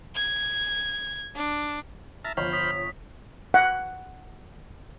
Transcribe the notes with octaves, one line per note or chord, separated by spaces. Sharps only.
G#6
D4
E5 A5 A#5 F6
G1 F3 C5 C#5 B5 F6
D#6 B6
F#5